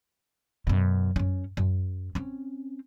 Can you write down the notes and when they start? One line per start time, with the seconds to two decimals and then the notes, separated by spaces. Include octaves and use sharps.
0.67 F#2 B2
1.16 F#2 C#4
1.57 F#2
2.15 C4 C#4